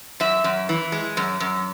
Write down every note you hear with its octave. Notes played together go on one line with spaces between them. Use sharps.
F#2 E5
F#2
E3
G#3
F#2
F#2